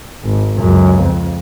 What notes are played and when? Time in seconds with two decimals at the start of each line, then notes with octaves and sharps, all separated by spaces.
0.24 G#1
0.59 C#2 F#2
1.01 F2